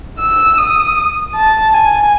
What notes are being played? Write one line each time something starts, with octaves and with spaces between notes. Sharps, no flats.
E6
D#6
A5
G#5